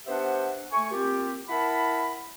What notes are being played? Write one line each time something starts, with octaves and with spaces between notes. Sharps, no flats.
B3 D4 G4 C5 E5 F#5
A3 G#5 C#6
A#3 C4 F4 G4
E4 A#4 F#5 A5 B5